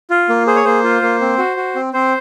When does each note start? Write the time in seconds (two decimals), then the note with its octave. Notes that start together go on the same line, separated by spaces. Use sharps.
0.10 F4
0.29 A#3
0.47 G#4 C5
0.56 C#5
0.65 A#3 C5
0.84 F4
1.02 A#3
1.21 C4
1.38 F#4
1.57 F#4
1.75 C4
1.93 C4 C5